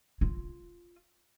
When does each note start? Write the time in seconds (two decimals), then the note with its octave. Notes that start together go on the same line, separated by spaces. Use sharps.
0.21 F4